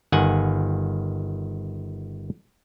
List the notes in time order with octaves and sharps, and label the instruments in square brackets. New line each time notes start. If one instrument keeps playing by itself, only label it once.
[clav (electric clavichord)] G1 D#3 F#5 G#5